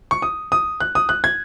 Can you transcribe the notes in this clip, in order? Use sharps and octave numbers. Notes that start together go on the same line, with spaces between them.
C#6
D#6
D#6
F#6
D#6
F#6
G#6